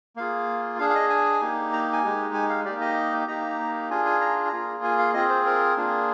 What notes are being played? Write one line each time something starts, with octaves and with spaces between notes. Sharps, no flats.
A#3 F4 G#4 F5
D4 G#4 F5
F5
D#5
G#5
A#3 D#4 G4
A#5
G#5
G#3 D#4 G4
G#5
F5
A#3 D#4 G4 D5
D#5
A#3 D#4 G4 A#5
D4 F4 G#4 G#5
G#5
A#5
A#3 F4 G#4 A#5
G#5
F5
C4 F4 G#4 D#5
C5
A#4
A#3 D4 F4 G#4